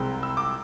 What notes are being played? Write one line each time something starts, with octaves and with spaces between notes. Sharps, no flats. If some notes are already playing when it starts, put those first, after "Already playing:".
Already playing: C2 C3 G#3 C4 B5
E6
D6